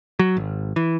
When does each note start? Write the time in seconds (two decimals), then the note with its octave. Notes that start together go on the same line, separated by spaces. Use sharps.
0.19 F#3
0.37 G#1
0.76 E3